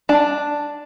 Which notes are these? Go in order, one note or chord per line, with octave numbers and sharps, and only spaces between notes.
D4 A5